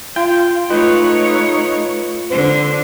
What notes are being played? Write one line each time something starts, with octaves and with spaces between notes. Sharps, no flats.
F4 G5
A3 D#4 F4 B4 C#5
D3 C5